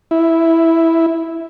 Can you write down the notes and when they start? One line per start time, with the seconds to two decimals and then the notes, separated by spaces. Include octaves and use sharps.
0.11 E4